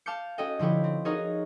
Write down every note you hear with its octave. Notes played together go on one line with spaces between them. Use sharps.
F5 A5 D6 F6 G6 C#7
C#4 F#4 A4 D#5 G5
D3 F3 E4 G4 C#5
C4
D#4 F#4 G#4 A#4 C#5 D#5